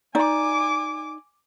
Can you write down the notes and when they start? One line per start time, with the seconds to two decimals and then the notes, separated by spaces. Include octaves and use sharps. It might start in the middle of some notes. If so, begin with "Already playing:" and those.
0.15 D#4 D5 G#5 D6